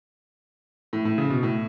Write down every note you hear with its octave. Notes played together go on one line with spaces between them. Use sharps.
A2
A2
C#3
B2
A2